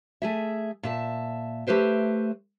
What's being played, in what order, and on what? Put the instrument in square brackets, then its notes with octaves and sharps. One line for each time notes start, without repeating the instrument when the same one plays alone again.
[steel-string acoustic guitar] A3 G#4 E5
A#2 E5 A5
A3 G4 B4 C5 E5